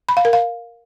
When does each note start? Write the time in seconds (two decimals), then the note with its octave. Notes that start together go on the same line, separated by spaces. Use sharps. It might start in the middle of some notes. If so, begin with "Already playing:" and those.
0.09 B5
0.17 F5
0.25 A#4
0.33 F5